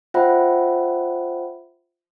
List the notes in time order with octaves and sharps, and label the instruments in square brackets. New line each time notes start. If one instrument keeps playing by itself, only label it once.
[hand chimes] F4 C5 E5 F#5 G5 B5